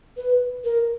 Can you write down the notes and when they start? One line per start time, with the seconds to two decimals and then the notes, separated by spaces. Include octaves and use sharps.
0.17 B4
0.64 A#4